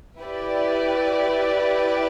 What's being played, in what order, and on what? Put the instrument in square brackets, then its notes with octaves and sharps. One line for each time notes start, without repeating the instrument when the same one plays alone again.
[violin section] E4 G4 B4 D5